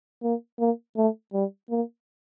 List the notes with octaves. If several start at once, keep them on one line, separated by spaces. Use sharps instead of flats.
A#3
A#3
A3
G3
A#3